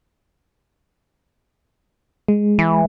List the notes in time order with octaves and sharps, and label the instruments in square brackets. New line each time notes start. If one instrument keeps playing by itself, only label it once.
[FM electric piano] G#3
[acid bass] E3